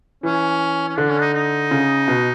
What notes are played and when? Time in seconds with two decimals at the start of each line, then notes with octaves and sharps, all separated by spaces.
0.23 E3 C#4
0.89 C#4
0.97 D3 D4
1.10 C#4
1.18 D4
1.21 D#4
1.33 D#4
1.71 C#3
2.08 B2